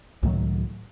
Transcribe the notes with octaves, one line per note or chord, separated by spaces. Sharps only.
C#2 A2 D#3 F#3